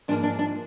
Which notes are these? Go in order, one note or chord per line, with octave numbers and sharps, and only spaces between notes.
G#2 F3 A#3 D4
D4
D4